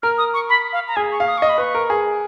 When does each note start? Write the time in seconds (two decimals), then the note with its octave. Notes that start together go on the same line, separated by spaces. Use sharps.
0.03 A#4 F6
0.18 D#6
0.34 C#6
0.49 B5
0.73 F5
0.88 A#5
0.96 G#4 G#5
1.12 C#6
1.20 F5
1.27 D#6
1.38 D#5 C#6
1.49 B5
1.58 B4 C#6
1.75 A#4
1.90 G#4